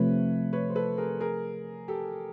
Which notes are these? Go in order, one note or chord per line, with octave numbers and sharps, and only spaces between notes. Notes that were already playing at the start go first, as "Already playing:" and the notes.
Already playing: C3 F3 A3 B4 C#5
B4 C#5
C5
A4 B4
G#4 A#4
G#4 A#4
G4 A4